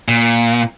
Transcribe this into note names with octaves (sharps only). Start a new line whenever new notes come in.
A#2